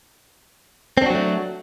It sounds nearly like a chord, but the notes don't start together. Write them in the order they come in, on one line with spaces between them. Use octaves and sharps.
C4 D4 F#4 F#3 A3